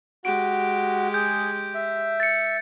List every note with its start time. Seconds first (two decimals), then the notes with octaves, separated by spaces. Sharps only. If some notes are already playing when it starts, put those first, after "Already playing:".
0.25 G#3 F#4 G4 D7
1.14 G#4 G6
1.75 E5
2.20 A6 C#7